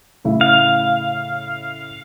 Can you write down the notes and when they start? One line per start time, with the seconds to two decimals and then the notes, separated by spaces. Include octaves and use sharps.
0.25 A2 C#3 E4
0.41 F5